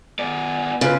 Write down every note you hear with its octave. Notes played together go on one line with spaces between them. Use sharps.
B3 D5
C#3 C#4 F4 B4